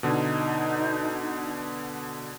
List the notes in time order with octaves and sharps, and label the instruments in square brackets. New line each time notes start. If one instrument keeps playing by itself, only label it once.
[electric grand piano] B2 D3 [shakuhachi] D#4